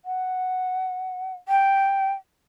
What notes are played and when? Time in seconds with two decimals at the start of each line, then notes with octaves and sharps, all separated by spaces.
0.05 F#5
1.48 G5